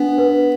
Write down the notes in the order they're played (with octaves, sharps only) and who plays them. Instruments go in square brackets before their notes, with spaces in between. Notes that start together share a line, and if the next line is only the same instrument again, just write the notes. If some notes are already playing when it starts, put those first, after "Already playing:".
Already playing: [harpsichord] B3 [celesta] D4
[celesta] B4